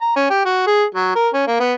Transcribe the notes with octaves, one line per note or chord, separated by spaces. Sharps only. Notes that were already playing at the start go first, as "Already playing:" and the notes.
A#5
C#4
G4
F#4
G#4
F#3
A#4
C#4
A#3
B3